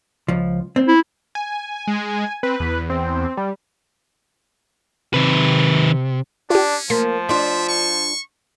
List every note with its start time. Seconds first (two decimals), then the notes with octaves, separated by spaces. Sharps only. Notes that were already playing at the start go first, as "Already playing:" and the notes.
0.28 C#2 F3
0.76 C4
0.88 E4
1.35 G#5
1.87 G#3
2.43 C4 B4
2.60 E2
2.90 C4
3.37 G3
5.14 C3 D#3 B4
6.50 C#4 D4 F4 G4
6.90 F3 A#3 C6 A6 B6
7.29 D4 F4 E5
7.68 C#6